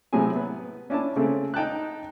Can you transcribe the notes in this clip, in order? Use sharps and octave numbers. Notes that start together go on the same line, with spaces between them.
A2 C3 F#3 C4 G#4 G#5
B3
C#4 D4 E4 D5 A5
C#3 A3 C4
D#4 G5 A5 F#6